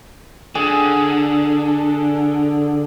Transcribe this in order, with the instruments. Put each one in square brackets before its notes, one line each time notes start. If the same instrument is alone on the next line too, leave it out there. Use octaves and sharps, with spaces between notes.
[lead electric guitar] D3 [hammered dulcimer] G#4